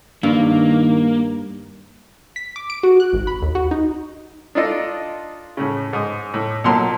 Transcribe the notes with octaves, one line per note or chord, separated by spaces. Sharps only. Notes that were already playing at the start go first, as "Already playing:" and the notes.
G2 D#3 A#3
B6
D6
D7
F#4
F#6
G#1
B5
D#2
F#4
D#4
D4 D#4 F4 A4 D5 D#5
A2 C#3
G#2 D#6
A2
B1 A#2 F#3 A#4 A5 C6